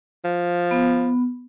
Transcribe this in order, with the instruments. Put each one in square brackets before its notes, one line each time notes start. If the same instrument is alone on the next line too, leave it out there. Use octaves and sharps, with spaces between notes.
[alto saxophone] F3
[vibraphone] B3